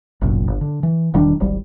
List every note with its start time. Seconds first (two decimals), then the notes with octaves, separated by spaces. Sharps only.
0.21 G1 C2 F#2 A#2
0.48 G1
0.61 D3
0.83 E3
1.14 E1 D#3 G3 D4
1.40 D1 G#1 G3